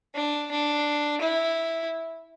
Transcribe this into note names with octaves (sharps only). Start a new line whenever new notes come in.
D4
D4
E4